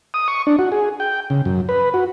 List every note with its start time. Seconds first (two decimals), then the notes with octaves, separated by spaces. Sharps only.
0.14 D#6
0.28 C#6
0.47 D4
0.59 F#4
0.72 G#4
1.00 G5
1.30 C#3
1.45 F#2
1.69 B4
1.94 F#4